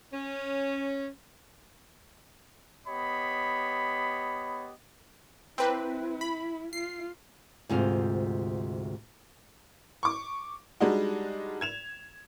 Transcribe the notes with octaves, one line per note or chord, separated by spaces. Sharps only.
C#4
B3 G4 C#5 D#5 B5
A#3 C4 E4 B4 G5
B5
F4 C7
D2 G#2 C3 F4
C#6 D6
G3 G#3 D4 D#4 F#4
G#6 E7 F7